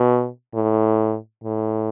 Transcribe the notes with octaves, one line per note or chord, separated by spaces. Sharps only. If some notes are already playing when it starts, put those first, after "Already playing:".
Already playing: B2
A2
A2